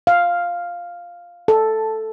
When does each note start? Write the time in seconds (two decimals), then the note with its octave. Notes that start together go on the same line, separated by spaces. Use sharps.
0.07 F5
1.48 A4